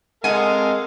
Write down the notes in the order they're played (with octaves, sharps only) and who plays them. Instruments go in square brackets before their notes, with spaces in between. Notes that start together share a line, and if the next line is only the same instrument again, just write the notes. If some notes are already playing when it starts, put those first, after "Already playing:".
[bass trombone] G#3 [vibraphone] C4 [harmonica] A4 A#4 F5 [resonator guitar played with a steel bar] F#5 G#5